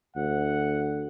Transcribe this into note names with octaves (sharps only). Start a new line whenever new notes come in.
D2 F#5